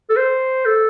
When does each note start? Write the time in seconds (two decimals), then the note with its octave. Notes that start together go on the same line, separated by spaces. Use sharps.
0.10 A4
0.17 C5
0.66 A4